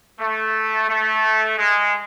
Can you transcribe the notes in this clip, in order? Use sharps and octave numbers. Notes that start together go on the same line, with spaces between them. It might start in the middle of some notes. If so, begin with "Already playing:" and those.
A3
A3
G#3